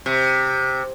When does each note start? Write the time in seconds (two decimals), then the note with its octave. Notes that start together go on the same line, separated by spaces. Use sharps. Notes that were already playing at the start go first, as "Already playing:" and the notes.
0.06 C3